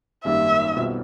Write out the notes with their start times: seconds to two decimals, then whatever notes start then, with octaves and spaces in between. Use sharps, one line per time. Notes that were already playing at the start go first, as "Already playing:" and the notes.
0.24 G#1 F#2 D#3 G3 A#3 E5
0.76 B1 B2 G3 C4 F4